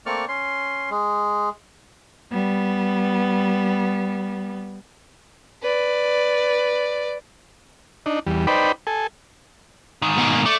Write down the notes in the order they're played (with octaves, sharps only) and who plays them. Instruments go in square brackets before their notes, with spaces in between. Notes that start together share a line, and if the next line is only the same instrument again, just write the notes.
[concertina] A3 A#3 C4 D5 C#6 F6
C#4 C6
G#3
[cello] G3 B3
[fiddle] B4 D5
[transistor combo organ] D4 D#4
E2 G3
D#4 B4 C5 D5 G5 B5
A4 G#5
[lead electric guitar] G#2 D#3
[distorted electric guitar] B2 A#3
[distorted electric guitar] A3 [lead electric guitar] D5